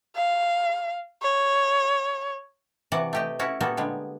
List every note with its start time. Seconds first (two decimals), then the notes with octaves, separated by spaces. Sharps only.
0.16 F5
1.22 C#5
2.92 C3 E3 F#4 D5 F#5
3.13 A3 G4 D#5
3.39 C#4 E4 F#4 F#5
3.61 A#2 G3 A#3 B3 F#4 A4
3.77 D3 G3 G#3